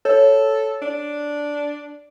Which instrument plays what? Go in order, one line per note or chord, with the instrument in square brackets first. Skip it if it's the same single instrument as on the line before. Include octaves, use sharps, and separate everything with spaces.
[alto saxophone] A4 [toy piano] C#5
[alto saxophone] D4